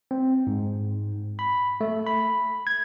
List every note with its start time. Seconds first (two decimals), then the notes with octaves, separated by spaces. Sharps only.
0.11 C4
0.47 G#2
1.39 B5
1.81 A3
2.06 B5
2.67 G#6